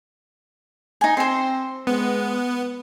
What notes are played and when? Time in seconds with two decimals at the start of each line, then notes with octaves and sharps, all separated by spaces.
1.01 D#4 G#5
1.17 C4 C5 C6
1.87 G#3 B3